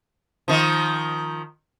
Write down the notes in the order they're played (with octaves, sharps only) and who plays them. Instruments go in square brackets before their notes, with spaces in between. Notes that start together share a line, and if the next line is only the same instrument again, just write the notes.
[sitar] D#3 F3